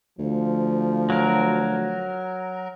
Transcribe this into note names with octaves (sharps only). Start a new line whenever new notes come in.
D2 F3
F#3 A#4